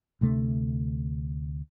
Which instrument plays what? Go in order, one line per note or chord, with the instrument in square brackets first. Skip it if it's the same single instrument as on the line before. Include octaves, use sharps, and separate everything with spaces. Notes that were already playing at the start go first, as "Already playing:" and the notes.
[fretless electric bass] D2 C3 A3 D4